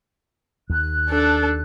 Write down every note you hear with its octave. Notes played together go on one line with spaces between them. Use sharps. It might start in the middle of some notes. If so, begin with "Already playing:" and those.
D#2 F#6
D4 A4